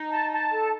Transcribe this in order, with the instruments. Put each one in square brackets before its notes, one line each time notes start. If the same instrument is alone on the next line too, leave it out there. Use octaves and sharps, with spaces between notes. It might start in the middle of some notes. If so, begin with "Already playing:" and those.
Already playing: [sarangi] D#4
[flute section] A5
A5
A4